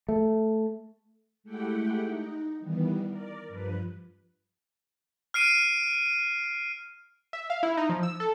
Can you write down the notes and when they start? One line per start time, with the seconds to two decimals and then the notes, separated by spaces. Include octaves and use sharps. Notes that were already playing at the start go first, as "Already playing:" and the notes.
0.09 A3
1.44 G#3 A3 E4 G4 F#5 G5
2.03 D#4
2.60 D#3 E3 G3 B3
3.07 A#4 D5
3.48 G2 F3 B4
5.34 F6 C7 D7 D#7
7.33 E5
7.50 F5
7.63 E4
7.77 D#4
7.89 F3
8.03 E6
8.20 A4